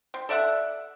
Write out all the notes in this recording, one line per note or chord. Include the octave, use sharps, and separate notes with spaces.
C4
A4 D5 E5 F#5